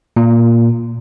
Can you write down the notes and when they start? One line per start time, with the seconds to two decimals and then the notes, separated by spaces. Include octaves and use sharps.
0.17 A#2